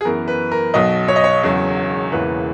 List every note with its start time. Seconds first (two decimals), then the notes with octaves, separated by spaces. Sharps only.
0.01 G#4
0.05 F#2 E3 B3 A#4
0.28 B4
0.52 A#4
0.74 B1 B2 F#3 D#5
1.08 C#5
1.16 D#5
1.24 C#5
1.43 E1 E2 C#3 F#3
2.12 E1 E2 C#3 E3 A#3 B4